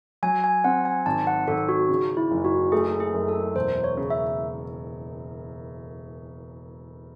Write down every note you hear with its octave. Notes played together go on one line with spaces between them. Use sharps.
F#3 G#5
G#5
C4 F#5
G#5
G#1 A5
F#5
G#1 A4
F#4
C#3
E4
F#1
F#4
A3 G#4
G#4
F#2
A4
E1 C5
C#5
C#3
E5